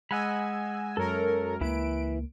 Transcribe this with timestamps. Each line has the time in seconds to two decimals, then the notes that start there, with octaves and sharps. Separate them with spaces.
0.11 G#3 D#5 F#5 G#5 B5 E6
0.97 F#2 A4 A#4 C#5
1.61 C#2 E3 A#3 E4 B4 D7